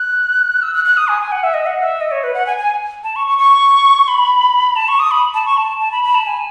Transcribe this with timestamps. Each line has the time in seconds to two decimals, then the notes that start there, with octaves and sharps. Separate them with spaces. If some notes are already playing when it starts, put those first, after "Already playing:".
Already playing: F#6
0.62 E6
0.74 F#6
0.85 F#6
0.97 D#6
1.08 G#5
1.20 G#5
1.32 F#5
1.43 E5
1.54 D#5
1.66 F#5
1.83 E5
2.01 D#5
2.11 C#5
2.23 B4
2.34 F#5
2.46 G#5
2.58 G#5
3.04 A5
3.16 C#6
3.27 C#6
3.38 C#6
4.08 B5
4.76 A5
4.88 C#6
4.99 D#6
5.11 B5
5.34 A5
5.46 C#6
5.57 A5
5.80 A5
5.92 B5
6.04 B5
6.15 A5
6.27 G#5